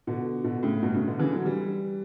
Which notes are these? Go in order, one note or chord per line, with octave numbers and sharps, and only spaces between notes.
B2 D3
B2 D3
A2 C#3
G2 B2
A2 C#3
B2 D3
C#3 E3
D3 F#3
E3 G3